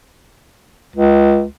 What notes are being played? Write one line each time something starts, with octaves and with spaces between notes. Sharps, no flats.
C#2